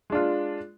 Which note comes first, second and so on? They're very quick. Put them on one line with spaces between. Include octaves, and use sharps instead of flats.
G#3 D4 F4